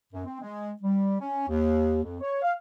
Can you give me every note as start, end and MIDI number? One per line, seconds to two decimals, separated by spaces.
0.13 0.24 42
0.26 0.40 60
0.41 0.70 56
0.82 1.15 55
1.20 1.46 61
1.48 2.00 39
2.03 2.17 41
2.21 2.41 73
2.42 2.54 77